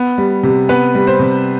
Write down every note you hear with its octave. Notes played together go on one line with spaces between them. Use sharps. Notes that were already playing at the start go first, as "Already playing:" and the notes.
Already playing: B3
G3
C3
B3 B4
G3
C5
C3